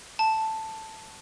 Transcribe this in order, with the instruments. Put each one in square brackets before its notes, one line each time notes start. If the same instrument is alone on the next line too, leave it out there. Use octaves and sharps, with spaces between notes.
[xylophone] A5